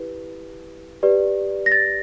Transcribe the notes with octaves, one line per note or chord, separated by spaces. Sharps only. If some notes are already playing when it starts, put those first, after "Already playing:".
Already playing: E4 G4 B4
G4 B4 D5
A#6
A6